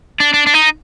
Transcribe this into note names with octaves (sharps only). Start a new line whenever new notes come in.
D4
D4
D4
D#4